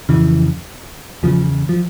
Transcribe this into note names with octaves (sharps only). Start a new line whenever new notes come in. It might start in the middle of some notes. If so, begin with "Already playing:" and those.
F2 C#3 E3
E2 C#3 F3
F3